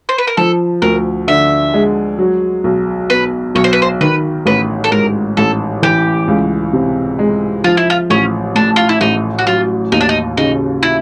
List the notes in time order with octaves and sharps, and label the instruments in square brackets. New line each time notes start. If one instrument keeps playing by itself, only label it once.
[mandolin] C5
B4
A#4
[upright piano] F3 [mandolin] A4
[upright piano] D2 [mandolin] A#4
[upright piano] D3 [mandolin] E5
[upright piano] G#3
F#3
B1
[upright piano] B2 [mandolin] B4
[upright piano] B1 [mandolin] C#5
[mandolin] C5
B4
C5
[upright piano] D#3 [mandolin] B4
[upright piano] A1 [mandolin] B4
[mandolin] A4
[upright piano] G#2 [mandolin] A#4
[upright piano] A1 [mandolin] A4
[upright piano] E3 [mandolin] G4
[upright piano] C#2
C3
G#3
[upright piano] F3 [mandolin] F4
[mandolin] E4
F4
[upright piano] A1 [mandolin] C#4
[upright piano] A2 [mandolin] D4
[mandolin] F4
E4
[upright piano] A1 [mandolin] D#4
[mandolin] F#4
[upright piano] F#3 [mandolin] F4
[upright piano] D#2 [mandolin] D#4
[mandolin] D4
D#4
[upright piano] C#3 [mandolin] D#4
[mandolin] E4